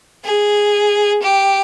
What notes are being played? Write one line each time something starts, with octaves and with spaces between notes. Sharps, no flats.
G#4
G4